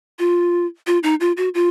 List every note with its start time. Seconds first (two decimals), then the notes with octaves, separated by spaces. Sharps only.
0.19 F4
0.87 F4
1.03 D#4
1.20 F4
1.37 F#4
1.54 F4